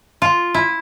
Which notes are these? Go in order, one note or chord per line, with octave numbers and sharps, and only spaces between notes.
F4
E4